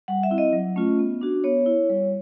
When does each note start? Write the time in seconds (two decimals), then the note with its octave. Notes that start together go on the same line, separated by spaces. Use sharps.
0.08 G3 F#5
0.23 E5
0.30 C4 E4
0.38 D#5
0.53 F#3
0.76 A3 C#4 F4
0.99 B3
1.22 D4 F#4
1.44 B3 C#5
1.66 E4
1.89 G3